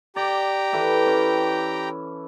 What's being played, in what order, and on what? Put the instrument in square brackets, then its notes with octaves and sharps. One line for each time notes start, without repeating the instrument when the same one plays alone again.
[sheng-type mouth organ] G4 G5 A#5 [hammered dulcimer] D5
[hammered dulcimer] E3 A4 B4
C#4